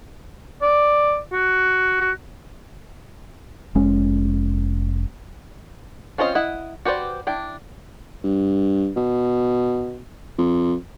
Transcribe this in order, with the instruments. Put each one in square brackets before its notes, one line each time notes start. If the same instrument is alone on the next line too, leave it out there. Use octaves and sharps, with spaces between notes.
[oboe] D5
F#4
F#4
[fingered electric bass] F1 G#3 C#4
[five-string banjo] C4 C#4 F4 C5 D#5
E4 D#5 F#5
F#4 G4 B4 C5 D5
D4 E4 G5
[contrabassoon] G2
B2
F2